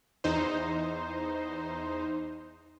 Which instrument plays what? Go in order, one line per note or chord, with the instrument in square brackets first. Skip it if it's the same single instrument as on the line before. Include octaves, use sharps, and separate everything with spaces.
[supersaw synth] E2 D#4 C5